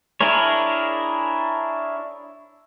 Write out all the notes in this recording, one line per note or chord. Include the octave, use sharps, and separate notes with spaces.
D4 E4 G#4 A#4 C#5